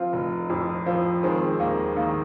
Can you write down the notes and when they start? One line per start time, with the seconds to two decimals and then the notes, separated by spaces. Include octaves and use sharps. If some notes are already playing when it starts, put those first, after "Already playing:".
Already playing: F3 C4 F4
0.13 F1
0.50 F2
0.86 F3
1.23 D#3 G#3 C4
1.59 D#2 A#3
1.96 D#3 A#3